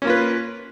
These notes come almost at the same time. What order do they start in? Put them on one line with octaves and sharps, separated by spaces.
C#4 A#3 F4 B4